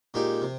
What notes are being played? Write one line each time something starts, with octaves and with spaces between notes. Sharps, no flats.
A#2 G#3 D#4 G4
C3